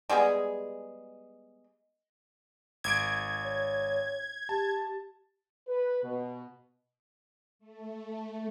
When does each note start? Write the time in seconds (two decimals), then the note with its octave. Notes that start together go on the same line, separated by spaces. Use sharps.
0.09 G3 G#3 B3 G#4
2.84 G#1 G#6 D7
3.43 C#5
4.49 G4 A5
5.67 B4
6.02 B2
7.59 A3